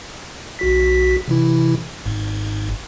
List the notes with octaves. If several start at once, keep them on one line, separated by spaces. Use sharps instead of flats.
B1 F#4 B6
C3 E3 E4
G#1 G#2